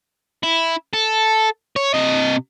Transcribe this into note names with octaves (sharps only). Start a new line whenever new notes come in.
E4
A4
C#5
C3 D#5